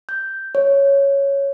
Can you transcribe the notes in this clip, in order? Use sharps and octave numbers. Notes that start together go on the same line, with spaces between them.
G6
C#5